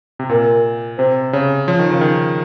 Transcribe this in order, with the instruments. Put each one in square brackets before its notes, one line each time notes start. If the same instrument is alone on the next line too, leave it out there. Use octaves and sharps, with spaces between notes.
[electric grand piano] C3
[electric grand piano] A#2 [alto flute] A#4
[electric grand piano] C3 [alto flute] C5
[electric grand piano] C#3 [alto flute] C#5
[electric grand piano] F3 [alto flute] C#5
[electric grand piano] D#3
C#3
D#3